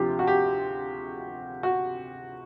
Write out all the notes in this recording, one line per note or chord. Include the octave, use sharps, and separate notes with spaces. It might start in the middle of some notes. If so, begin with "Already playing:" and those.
Already playing: D2 C3 F3 F4 G4
F#4
G4
F#4